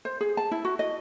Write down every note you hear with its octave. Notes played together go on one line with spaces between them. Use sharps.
C5
G#4
A5
E4
F#4
D#5